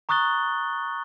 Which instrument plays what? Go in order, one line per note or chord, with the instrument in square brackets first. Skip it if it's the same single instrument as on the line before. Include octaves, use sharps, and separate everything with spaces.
[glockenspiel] A#5 C#6 D#6 F#6 A6 G7